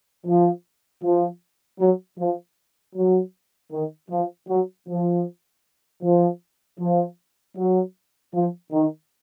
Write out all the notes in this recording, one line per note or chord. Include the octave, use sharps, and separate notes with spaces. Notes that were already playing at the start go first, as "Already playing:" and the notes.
F3
F3
F#3
F3
F#3
D#3
F3
F#3
F3
F3
F3
F#3
F3
D#3